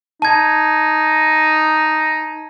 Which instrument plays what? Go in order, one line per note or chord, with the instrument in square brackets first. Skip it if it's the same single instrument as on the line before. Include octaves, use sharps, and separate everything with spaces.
[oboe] D#4 [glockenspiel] A5 G#6